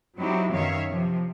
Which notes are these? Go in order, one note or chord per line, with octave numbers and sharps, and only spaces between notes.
F#3 C4 D#4 E4 G4
F#2 B2 D#3 C#5 E5 F5
C3 F3